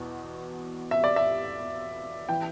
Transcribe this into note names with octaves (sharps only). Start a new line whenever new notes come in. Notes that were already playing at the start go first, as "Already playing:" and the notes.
Already playing: E2 B2
E5
D5
E5
E3 G5